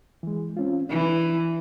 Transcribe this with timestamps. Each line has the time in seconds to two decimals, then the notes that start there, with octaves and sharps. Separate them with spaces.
0.23 E3 G#3
0.57 C4 C#4 F4
0.89 E3 D4